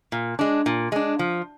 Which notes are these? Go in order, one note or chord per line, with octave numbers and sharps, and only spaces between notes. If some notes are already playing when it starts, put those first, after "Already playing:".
A#2
G#3 D4
A#2
G#3 D4
F3